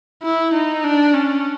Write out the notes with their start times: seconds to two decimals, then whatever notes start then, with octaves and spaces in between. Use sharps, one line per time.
0.23 E4
0.53 D#4
0.84 D4
1.14 C#4